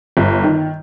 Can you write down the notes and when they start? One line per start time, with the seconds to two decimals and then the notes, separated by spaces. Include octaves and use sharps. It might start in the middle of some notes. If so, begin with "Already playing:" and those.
0.17 G1
0.43 D#3